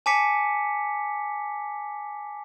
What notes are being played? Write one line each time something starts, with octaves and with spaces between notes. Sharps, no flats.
G#5 A5 D6 B6 C#7